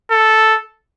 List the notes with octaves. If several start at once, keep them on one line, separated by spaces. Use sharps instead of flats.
A4